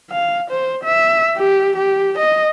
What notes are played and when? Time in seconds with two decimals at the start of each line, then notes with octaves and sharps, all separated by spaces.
0.11 F5
0.50 C5
0.84 E5
1.37 G4
1.76 G4
2.18 D#5